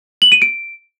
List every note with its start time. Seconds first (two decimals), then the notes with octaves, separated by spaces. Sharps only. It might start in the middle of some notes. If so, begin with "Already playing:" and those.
0.22 F#7
0.32 D#7
0.42 D7